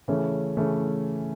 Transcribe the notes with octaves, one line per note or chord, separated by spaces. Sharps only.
C#3 E3 A3 C#4
C#3 E3 A3 C#4